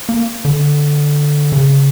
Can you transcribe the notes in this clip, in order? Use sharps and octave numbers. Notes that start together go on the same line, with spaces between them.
A#3
D3
C#3